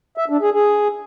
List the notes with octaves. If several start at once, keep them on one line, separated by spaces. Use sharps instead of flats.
E5
D4
G#4
G#4